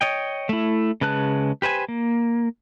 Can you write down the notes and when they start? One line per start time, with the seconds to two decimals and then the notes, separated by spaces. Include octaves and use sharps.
0.01 C#5 D#5 G5
0.49 A3 E4
1.01 C#3 G#3 B4 A5 F#6
1.62 G4 B4 C5 G#5
1.88 A#3